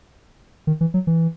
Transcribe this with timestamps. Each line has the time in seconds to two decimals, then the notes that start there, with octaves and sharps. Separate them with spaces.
0.67 D#3
0.81 E3
0.94 F#3
1.07 E3